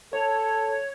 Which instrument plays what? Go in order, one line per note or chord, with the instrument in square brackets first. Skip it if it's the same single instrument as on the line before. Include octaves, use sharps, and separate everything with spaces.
[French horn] A4 [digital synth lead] C#5